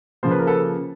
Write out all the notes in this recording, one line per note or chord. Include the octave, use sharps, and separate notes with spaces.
C#3 F3 A#3 C5
B4
A#4
A4 B4